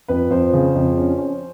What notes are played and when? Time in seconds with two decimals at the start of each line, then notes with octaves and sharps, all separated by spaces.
0.08 F2 B4
0.30 F2 C5
0.53 C#3
0.75 F2
0.97 C#4
1.18 C#4